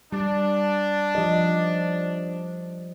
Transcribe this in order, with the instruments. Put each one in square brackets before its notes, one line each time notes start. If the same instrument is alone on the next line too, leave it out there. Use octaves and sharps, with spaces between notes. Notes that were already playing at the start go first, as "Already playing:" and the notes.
[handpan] G3 [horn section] D4
[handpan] F3 G4 D#5